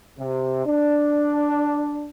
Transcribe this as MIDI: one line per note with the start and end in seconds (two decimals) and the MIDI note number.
0.20 0.65 48
0.66 2.09 62